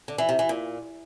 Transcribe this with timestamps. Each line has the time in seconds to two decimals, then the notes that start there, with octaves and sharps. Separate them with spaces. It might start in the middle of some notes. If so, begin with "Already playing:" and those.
0.08 D3
0.18 E3
0.29 C3
0.39 E3
0.49 A#2